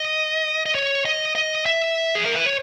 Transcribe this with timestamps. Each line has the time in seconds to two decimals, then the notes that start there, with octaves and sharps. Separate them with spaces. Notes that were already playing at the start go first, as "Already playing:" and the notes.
Already playing: D#5
0.66 D#5
0.75 C#5
1.05 D#5
1.35 D#5
1.66 E5
2.15 G#4
2.25 A#4
2.36 B4
2.46 C#5